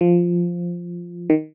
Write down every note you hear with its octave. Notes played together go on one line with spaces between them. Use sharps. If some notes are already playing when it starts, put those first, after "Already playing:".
F3
D#3